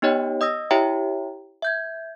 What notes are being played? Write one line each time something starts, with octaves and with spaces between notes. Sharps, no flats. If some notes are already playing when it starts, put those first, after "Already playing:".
B3 D#4 G4 C#5 D#5 G5
D#5 D#6 E6 A#6
E4 G4 C#5 E5 G5 A#5
E5 G6 G#6